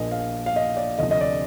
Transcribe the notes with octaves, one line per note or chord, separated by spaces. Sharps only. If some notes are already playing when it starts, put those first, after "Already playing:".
Already playing: A#1 A#2 F3 A#3 D#5
F5
F5
D#5
D5
D2 C3 F3 D#5
D#5
D5